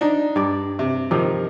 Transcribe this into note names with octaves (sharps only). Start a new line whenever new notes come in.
D4 D#4
G2 D5
C3
C3 D#3 F3